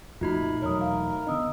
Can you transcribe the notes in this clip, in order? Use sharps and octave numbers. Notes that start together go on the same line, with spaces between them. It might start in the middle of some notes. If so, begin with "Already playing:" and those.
F2 A#2 F3 A3 D#4 F4 F#4 B5
E1 F#3 A#4 C#5 D#6
F5
D3 B3 D4 D#5 D#6 E6